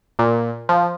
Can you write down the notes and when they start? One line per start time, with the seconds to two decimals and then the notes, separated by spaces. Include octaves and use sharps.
0.19 A#2
0.69 F3